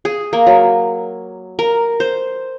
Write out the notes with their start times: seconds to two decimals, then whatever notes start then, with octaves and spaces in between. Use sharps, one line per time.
0.05 G#4
0.33 A#3
0.46 F#3
1.59 A#4
2.00 C5